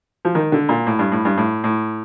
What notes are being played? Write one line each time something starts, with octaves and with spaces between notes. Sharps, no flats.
F3
D#3
D3
A#2
A2
G2
A2
G2
A2
A2